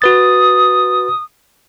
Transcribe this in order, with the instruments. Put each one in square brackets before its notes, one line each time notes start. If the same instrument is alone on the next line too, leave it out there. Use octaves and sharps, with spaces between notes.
[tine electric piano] F#4 B4 A6 [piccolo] D#6